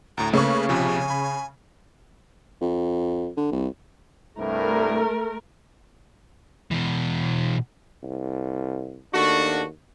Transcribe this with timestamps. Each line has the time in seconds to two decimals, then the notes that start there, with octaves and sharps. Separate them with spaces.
0.18 D2 A2 A#5
0.33 C#3 A3 A#3 C#4 B4 C#6
0.69 A#1 C3 F3 G#5
1.10 B5
2.61 F2
3.37 D3
3.52 C2
4.38 C2 G2 A3 E4 A#4
6.71 B2 E3
8.03 C2
9.14 D#2 A3 D4 F#4